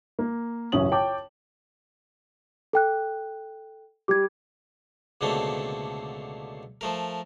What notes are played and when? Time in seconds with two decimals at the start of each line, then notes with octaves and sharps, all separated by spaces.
0.19 A#3
0.72 A1 F#2 C#3 C#4 D#6 F#7
0.92 C#5 G5 A5 D6
2.73 A4 G5 F#6
4.08 G3 G4 D6 G#6
5.21 C#2 B2 D3 A3 A#3 C4
6.81 F3 A3 A#4